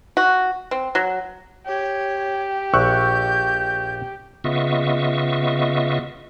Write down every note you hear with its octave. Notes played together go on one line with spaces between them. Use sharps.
F#4
C4
F#3
G4 C#5
A#1 C#6 E6 F#6 G6
C#3 B3 F4 D#5 E5 C#6